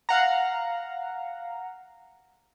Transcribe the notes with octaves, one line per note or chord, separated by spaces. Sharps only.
F5 F#5 A#5